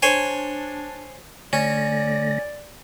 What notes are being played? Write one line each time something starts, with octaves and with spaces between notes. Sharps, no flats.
D4 C5 C#5 G#5
D3 A3 C#4 D5 A#6